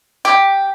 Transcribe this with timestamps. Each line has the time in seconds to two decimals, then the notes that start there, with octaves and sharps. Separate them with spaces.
0.25 G4